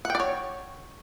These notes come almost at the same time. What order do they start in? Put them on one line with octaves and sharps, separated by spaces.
F#5 G5 D5 C#5